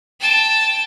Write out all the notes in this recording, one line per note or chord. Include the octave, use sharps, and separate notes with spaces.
G5 A5